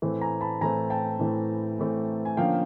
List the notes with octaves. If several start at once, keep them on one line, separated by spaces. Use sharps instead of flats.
A2 E3 A3 C4
G#5 A#5
A5 B5
A2 E3 A3 C4 G#5 A#5
G5 A5
A2 E3 A3 C4
A2 E3 A3 C4
G#5
D3 F3 A#3 C#4 F5 G5